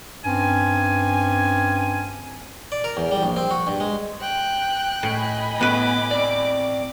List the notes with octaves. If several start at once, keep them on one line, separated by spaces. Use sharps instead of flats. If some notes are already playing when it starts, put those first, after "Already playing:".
G2 C4 C#4 G#5
D5
A#4
E2
G3
A#1
C4
F#4
G2
G#3
G5 F#6
A2 D#5 G#5 B5
A2 B3 B4 D6
C4 D5